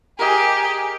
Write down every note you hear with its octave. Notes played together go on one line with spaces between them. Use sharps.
G4 G#4 A#4 D#5 G#5